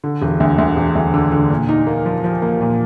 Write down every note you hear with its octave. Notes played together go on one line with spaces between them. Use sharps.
D3
E1
D2
D2
E1
D2
D3
D3
A#2
D#4
A#3
F3
F3
A#3
A#2